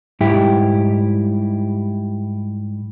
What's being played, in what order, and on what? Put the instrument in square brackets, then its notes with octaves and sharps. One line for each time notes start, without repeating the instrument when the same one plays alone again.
[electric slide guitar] G#2 G3 E4 G4